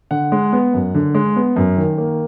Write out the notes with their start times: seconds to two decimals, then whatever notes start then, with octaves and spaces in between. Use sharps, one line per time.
0.11 D3 F#5
0.32 G#3
0.52 B3
0.74 F#2
0.94 D3
1.15 G#3
1.36 B3
1.56 F#2
1.77 D#3
1.98 A#3